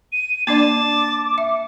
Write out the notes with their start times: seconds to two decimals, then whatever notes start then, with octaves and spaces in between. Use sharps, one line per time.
0.12 D#7
0.47 A#3 D4 D5 A5 D6
1.38 E5